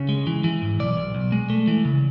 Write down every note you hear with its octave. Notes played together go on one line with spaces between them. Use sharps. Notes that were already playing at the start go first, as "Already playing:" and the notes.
Already playing: C#3 C#5
G#3
E3
E3
G#2
B1 D5
B1
B1
G#3
A3
E3
C#3